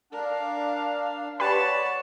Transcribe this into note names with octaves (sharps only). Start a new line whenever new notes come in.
D4 A#4 F5
G4 B4 C#5 D5 F#5 A5 B5